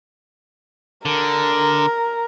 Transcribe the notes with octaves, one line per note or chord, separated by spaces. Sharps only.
D3 A#4